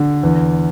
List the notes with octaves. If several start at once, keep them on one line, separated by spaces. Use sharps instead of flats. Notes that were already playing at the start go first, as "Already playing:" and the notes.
Already playing: D3
E2